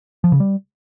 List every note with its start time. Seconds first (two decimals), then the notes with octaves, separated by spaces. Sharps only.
0.24 F3
0.32 C#3
0.40 G3